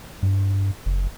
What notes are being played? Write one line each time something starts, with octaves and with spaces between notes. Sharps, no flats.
G2
F#1